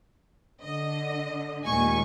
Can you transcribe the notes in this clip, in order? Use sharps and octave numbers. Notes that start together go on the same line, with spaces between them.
D3 D#5
D#2 A#2 G#3 G#5 C#6